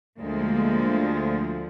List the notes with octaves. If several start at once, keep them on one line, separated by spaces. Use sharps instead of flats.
D2 D3 F3 G#3 A#3